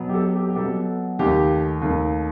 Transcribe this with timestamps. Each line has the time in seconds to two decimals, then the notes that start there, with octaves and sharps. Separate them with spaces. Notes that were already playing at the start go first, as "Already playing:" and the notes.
Already playing: B2 F#3 B3
0.09 G4
0.14 A4
0.35 G4
0.50 G4
0.56 B2 F#3 B3 A4
1.19 D#2 D#3 A3 G4
1.82 D#2 D#3 A3